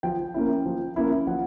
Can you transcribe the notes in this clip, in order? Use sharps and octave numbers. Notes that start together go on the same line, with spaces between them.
F3 G5
A#3 C#4 E4
F3
A#3 C#4 E4
F3 F#5